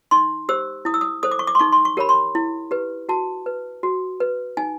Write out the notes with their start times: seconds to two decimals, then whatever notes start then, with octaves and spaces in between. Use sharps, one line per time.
0.11 D#4 C6
0.49 G4 C5 E6
0.85 E4 D#6
0.94 E6
1.01 D#6
1.23 A4 C5 D#6
1.31 D6
1.39 C#6
1.47 D6
1.55 C6
1.59 D#4 C#6
1.72 C6
1.85 C#6
1.97 G4 A#4 C#5 B5
2.09 C6
2.35 E4
2.71 G4 B4
3.09 F#4 A5
3.46 B4
3.83 F#4
4.20 B4
4.57 D#4 G#5